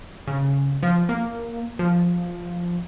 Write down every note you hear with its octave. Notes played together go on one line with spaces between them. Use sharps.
C#3
F3
A#3
F3